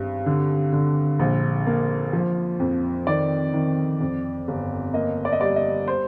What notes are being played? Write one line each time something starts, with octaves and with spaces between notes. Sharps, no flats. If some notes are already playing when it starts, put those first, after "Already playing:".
Already playing: G#1 G2
D3
D3
A#1
A#3
F3
F2
D#3 D5
D#3
F2
G1
A#3 D#5
D5
D#5
G3 D5
D#5
C5